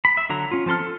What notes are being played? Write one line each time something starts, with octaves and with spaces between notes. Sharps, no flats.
B5
E5
D3 F#3 A#5
C#4 F4
F3 C4 A4 C6 F6
A4